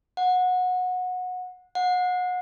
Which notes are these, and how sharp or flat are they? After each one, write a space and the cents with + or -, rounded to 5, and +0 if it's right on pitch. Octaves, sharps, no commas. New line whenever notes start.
F#5 -20
F#5 -30